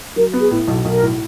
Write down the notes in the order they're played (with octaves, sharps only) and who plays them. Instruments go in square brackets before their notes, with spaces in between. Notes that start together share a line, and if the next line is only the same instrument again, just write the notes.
[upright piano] F#3 [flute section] A#4
[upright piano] B3
[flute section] G#4
[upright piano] A2
B1
[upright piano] B1 [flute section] A#4
[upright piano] A2